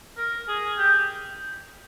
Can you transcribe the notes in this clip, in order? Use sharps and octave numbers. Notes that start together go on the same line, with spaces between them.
A#4
G#4
G4